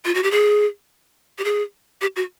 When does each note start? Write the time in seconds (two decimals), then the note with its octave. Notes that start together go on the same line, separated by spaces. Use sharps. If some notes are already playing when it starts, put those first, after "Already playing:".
0.05 F4
0.15 F#4
0.23 G4
0.31 G#4
1.38 G4
1.45 G#4
2.01 G4
2.16 F#4